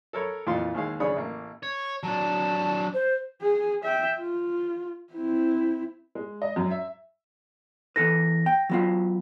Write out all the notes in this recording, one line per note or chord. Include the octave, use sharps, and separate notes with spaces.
A4 A#4 C#5 B5
F2 A#2 E3 F4 F5 C6
D#2 G#3 F5
C#3 D4 C#5 B5 D#6
A1 A#3
C#5
F#3 D4 A5
C5
G#4
E5 G5
F4
C4 E4
G#3
D#5
F#2
E5
E2 A4 B4 A#6
G5
F#3 B3 F4